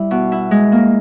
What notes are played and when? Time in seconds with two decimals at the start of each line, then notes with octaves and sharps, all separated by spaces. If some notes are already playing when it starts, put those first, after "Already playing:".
Already playing: G3 E4
0.11 B2
0.32 E4
0.51 G#3
0.72 A#3